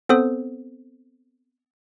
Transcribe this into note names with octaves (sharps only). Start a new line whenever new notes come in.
B3 C4 A4 C5 D#6